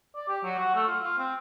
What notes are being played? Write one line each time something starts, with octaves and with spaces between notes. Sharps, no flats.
D5
G4
F#3
F#4
A3
F4
F4
C4